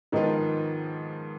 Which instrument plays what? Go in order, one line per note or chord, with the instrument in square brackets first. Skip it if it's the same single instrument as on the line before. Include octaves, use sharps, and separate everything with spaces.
[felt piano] G#2 F3 B3 F4 [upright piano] D#3 D#4